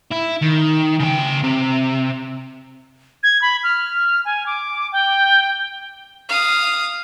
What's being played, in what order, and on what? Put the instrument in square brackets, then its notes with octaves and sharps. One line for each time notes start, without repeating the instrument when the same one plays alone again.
[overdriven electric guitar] E4
D#3
C#3 G5
C3
[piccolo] G#6
B5
F6
G#5
D6
G5
[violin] F5 D#6